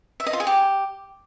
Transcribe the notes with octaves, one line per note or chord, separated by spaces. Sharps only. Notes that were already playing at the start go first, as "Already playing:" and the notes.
E5
D#5
F4
G#4
G4